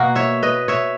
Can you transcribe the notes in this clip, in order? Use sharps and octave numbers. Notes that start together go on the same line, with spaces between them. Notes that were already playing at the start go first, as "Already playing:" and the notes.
Already playing: B2 A#3 F#4 A#4
C#5 E5
B4 D#5
C#5 E5